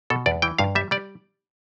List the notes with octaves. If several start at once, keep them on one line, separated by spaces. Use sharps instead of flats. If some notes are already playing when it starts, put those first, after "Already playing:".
B2 A4
E2 D5
E3 G5
G2 F5
G3 E5
G3 D5